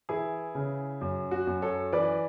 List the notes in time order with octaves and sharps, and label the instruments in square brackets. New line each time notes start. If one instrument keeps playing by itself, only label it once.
[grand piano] E3 E4 G#4
C#3
F#2
F#4
F#2
A4 C#5
E3 B4 D5